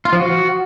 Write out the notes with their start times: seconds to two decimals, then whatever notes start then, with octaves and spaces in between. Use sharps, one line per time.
0.05 F4
0.13 F3
0.20 F#4